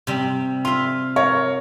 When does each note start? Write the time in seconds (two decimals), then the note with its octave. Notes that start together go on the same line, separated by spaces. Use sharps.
0.07 C3 G3
0.65 F4 E5 C6
1.16 A#4 C#5